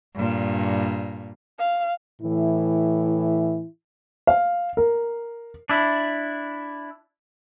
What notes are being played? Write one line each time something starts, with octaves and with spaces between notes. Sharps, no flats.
G2 A#2
F5
A2 E3 E4
F5
A#4
D4 E4